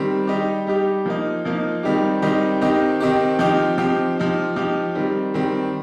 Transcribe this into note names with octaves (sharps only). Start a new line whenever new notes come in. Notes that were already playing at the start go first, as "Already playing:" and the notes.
Already playing: D#3 G3 C4
G3 D#4 G4
G3 D#4 G4
F3 A#3 D#4
F3 A#3 D#4
D#3 G3 C4 D#4 G4
D#3 G3 C4 D#4 G4
D#3 C4 D#4 G4
D#3 C4 D#4 G4
F3 C4 D#4 G4
F3 C4 D#4 G4
F3 D#4 G4
F3 D#4 G4
D#3 G3 C4
D#3 G3 C4